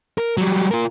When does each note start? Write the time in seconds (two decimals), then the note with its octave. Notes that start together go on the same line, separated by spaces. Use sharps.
0.18 A#4
0.37 F#3 G3
0.71 F4 A#4